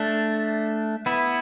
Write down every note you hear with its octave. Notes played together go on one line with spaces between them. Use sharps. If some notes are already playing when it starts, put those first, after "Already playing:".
Already playing: A3 D4
B3 E4